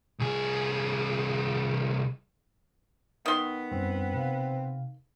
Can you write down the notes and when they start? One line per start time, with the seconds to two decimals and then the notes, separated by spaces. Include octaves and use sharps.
0.19 C2 G#4
3.26 D#3 B3 C6
3.71 F#2 G3 C4 C#4
4.13 C3 F5